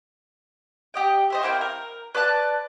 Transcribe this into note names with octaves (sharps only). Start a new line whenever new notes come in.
G4 D#5 G5
D#4 C5 E5
A#3 C4 E4 G5
A#4
B4 D5 A5 F#6